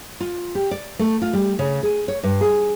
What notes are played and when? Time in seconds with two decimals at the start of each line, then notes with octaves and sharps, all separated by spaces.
0.20 F4
0.55 G4
0.71 D5
0.99 A3
1.22 F4
1.33 G3
1.59 C#3
1.83 G#4
2.08 C#5
2.23 G2
2.41 G#4